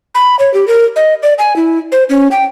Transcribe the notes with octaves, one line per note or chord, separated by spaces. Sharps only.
B5
C#5
G4
A#4
D#5
D5
G#5
E4
C5
C#4
G5